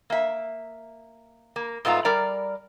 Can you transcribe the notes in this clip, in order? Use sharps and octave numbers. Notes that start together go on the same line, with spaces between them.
A#3 E5
A#3
G#2 A3 B3 F4 A#5
G3 A#4 D5 A#5